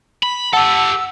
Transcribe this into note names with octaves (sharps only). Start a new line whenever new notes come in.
B5
G4 A4 F#5 A5 E6